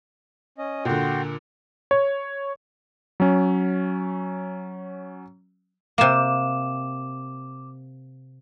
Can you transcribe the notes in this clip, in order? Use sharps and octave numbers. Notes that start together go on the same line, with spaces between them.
C#4 D#5
A#2 D3 F#4 G5 C6
C#5
F#3 C#4
C3 A#3 D6 E7